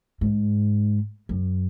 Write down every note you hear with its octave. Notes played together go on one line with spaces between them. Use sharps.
G#2
F#2